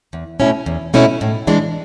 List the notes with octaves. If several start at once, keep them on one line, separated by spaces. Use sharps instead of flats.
E2
B2 A3 C#4 E4
E2
B2 A3 C#4 E4
A2
E3 G#3 D4